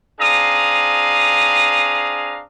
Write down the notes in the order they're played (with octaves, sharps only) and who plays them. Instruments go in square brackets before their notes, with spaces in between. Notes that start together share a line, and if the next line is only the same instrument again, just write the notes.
[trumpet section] C4 D4 G#4 F5 A#5 D#6